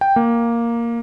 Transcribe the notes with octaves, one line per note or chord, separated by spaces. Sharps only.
G5
A#3